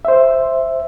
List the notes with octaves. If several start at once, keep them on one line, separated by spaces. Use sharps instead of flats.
C5 E5